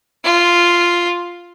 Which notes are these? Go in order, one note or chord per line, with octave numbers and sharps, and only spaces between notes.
F4